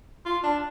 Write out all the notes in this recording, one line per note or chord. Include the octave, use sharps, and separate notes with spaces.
F4
D4